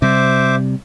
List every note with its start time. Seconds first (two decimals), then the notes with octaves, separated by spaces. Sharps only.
0.02 C3 G3 C5 E5 D6